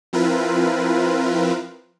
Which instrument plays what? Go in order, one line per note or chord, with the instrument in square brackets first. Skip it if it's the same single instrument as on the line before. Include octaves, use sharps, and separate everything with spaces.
[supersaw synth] F3 C4 E4 F4 A#4 B4